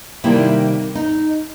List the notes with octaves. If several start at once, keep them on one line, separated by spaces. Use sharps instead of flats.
C3 D#3 G3 A#3 E4
D#4